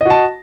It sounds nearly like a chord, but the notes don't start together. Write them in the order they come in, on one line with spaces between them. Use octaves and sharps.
D#5 F#4 A5